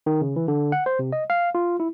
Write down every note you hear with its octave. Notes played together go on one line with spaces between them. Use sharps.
D#3
C#3
E3
D3
F#5
C5
C3
D#5
F5
F4
E4